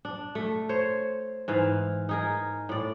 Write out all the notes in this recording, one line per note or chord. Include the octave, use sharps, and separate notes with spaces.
D4
A3
C5 C#5
G#2 E3 F5
D#4 G#4 A#4
A2 D5